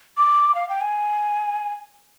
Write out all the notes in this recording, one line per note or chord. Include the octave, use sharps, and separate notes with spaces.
D6
F5
G5
G#5